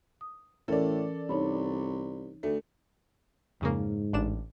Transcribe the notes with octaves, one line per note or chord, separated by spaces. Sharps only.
D#6
A2 E3 C#4 A4 A#4 D5
C2 D#4 C#5 B5
D2 A3
F2 G#2 C#3 A#3
A1 D4 E7